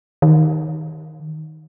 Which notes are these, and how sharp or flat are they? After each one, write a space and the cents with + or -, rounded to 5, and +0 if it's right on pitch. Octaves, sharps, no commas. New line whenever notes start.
D#3 +10